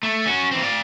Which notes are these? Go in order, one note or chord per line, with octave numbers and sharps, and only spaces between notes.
A3
C#4 F#4
E3 C4
D5 F5